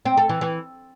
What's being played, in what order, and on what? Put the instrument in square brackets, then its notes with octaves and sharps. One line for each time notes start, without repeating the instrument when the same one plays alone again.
[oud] C4
A4
E3
E3